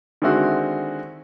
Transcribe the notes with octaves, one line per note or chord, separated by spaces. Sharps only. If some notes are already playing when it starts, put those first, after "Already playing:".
D3 D#3 G#3 C4 E4 F#4